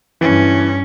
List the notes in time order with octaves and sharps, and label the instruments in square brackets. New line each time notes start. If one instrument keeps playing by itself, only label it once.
[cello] G2 C#4 [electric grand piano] E3